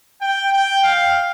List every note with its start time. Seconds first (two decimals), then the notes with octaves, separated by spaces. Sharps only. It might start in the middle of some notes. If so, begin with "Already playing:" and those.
0.21 G5
0.52 G5
0.84 F5